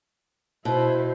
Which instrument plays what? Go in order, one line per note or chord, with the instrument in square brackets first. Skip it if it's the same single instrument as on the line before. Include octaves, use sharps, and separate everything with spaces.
[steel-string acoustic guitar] B2 [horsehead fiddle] E4 C5